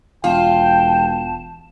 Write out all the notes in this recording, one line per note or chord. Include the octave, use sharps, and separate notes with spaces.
E1 F4 G5 A5